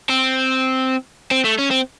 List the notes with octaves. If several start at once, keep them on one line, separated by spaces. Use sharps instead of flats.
C4
C4
A3
C#4
C4